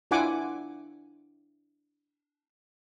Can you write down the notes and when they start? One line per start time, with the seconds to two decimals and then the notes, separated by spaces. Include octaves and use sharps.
0.11 D4 E4 F4 F#5 G#5 D6